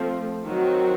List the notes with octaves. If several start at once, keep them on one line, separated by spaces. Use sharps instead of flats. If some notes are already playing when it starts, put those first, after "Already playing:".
Already playing: F3 A3 C4
D#3 F#3 C4 F#4